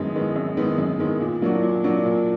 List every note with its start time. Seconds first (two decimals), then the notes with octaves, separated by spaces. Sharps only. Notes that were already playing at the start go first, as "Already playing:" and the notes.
Already playing: F#2 D#3 G#3 B3
0.15 D#3 G#3 B3
0.36 F#2
0.57 D#3 G#3 B3
0.78 F#2
0.99 D#3 G#3 B3
1.20 A#2
1.42 F#3 A#3 D4 F#4
1.63 A#2
1.84 F#3 A#3 D4 F#4
2.05 A#2